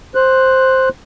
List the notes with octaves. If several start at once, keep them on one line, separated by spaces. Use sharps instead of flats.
C5 F#6